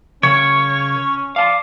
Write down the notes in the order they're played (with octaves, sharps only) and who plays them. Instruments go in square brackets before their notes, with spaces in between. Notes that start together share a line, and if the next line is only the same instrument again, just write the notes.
[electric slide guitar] C#3 A#4 [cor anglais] C#4 [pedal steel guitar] C#5
[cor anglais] D5 [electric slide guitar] F5 A5